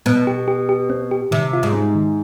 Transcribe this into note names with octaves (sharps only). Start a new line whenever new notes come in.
B2 B3
G4
G4
G4
C4
G4
C3 D#3
F4
G#2
C4
D#3